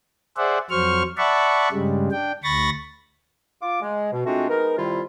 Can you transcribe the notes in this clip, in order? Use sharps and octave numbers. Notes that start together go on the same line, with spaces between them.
G#4 C5 D5 E5 F#5
F2 F#3 C5 C#6 F6
D5 E5 F#5 A5 B5 C#6
G2 C#3 G3 G#3
D4 G5
D2 B5 C#6 A6 A#6
F4 D6
G#3
B2
G#3 A3 C4 D4 F4 F#4
G#3 B3 D#4 A#4
F2 C3 D#3 G3 E4 F4